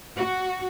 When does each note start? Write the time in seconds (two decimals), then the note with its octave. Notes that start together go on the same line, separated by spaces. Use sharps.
0.16 F#4